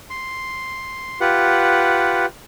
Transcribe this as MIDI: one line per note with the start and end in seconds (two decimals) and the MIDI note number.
0.10 1.20 84
1.20 2.26 65
1.20 2.26 67
1.20 2.26 71
1.20 2.26 78